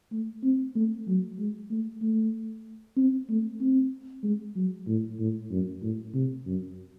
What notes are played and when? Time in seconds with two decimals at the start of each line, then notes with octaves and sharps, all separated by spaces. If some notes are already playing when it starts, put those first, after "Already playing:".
0.12 A3
0.43 C4
0.75 A3
1.07 F#3
1.39 G#3
1.71 A3
2.02 A3
2.97 C4
3.29 A3
3.61 C4
4.23 G#3
4.56 F#3
4.87 A2
5.19 A2
5.51 F#2
5.82 A2
6.14 C3
6.46 F#2